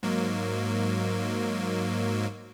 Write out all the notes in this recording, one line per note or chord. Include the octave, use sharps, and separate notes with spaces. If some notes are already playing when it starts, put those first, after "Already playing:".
G#2 F#3 A#3